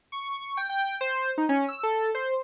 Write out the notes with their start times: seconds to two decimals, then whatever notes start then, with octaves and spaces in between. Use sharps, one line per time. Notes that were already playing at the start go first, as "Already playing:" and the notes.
0.12 C#6
0.57 G5
0.69 G5
1.01 C5
1.38 D#4
1.49 C#4
1.68 E6
1.83 A4
2.15 C5